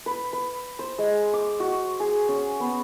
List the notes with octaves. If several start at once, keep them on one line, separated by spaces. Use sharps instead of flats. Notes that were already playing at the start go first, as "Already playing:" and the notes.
B4
B4
C5
G#3
D6
F#4
G#4
C#4
B3